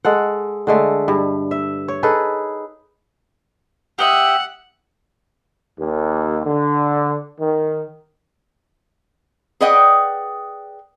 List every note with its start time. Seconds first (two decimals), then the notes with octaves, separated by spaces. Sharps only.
0.05 G#3 A4 F#5
0.67 D3 G#3 A3
1.08 G2
1.51 E5
1.88 C#5
2.03 D#4 G#4 A4 B4
3.99 G4 D#5 E5 F#5
5.80 D#2
6.46 D3
7.39 D#3
9.61 G#4 B4 D5 D#5 F#5 G5